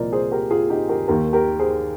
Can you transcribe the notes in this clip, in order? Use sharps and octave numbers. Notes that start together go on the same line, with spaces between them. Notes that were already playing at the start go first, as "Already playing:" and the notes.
Already playing: C2 A#2 F3 A#4 C5 D5 D#5
G#4 C5
G4 A#4
F4 G#4
D#4 G4
G4 A#4
D#2 D#3 G4 A#4
G4 A#4
G#4 C5